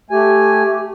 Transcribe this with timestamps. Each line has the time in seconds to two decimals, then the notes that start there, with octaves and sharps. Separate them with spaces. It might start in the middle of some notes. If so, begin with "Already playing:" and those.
0.10 A3 G4 G#5